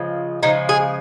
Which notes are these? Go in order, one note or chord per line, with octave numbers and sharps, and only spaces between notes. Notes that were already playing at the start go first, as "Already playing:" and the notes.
Already playing: C#3 F3 G#3
C#3 F3 G#3 D#4
G#4